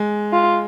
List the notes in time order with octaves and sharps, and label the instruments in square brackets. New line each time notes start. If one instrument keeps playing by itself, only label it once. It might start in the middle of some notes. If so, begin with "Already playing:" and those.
Already playing: [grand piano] G#3
[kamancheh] F4